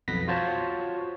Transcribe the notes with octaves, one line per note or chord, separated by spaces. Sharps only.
B1 F2 B3 B4 A#6 B6
F4 F#4 C5 C#5 A5